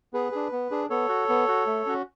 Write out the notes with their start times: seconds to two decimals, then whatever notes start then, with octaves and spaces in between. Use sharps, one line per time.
0.13 B3 G#4 B4
0.32 D4 G#4
0.52 B3
0.71 D4 G#4
0.90 B3 A4 C#5
1.09 F#4
1.29 B3
1.48 F#4
1.67 A3
1.86 C#4 F#4